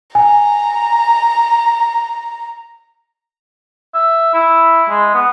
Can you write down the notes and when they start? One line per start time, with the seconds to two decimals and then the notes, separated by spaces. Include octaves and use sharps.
0.15 G#5 A#5
3.94 E5
4.34 E4
4.89 G#3
5.14 B3